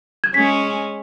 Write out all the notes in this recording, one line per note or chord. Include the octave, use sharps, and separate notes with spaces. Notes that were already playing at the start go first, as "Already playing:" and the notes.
G#6
G#3 C#4 B6